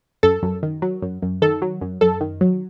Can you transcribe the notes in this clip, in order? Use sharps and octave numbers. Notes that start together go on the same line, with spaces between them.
F#2 A4
F#2
D#3
F#3
F#2
F#2
D#3 A4
F#3
F#2
F#2 A4
D#3
F#3